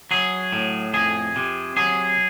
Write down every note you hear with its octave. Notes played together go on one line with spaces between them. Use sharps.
F#3 G#4
A2
F2 G#4
C3
F#3 G#4